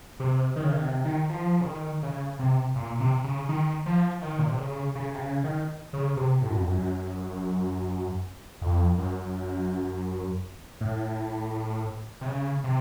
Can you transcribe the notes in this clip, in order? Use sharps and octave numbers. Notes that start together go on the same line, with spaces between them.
C3
D#3
C#3
D#3
C3
D#3
F3
C#3
D#3
C#3
C3
A#2
C3
C#3
D#3
F3
D#3
A#2
C3
C#3
C#3
C3
C#3
D#3
C#3
C3
A2
F#2
F2
F#2
F#2
F2
F#2
A2
C3
C#3
C3